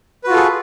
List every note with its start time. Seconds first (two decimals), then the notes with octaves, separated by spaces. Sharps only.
0.24 B4
0.27 F#4
0.30 F4
0.33 A4
0.36 G#4